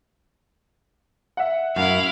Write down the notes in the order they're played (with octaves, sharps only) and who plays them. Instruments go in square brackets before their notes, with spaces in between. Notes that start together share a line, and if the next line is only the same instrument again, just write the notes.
[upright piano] E5 F#5
[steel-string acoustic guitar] F#2 [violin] E4 F5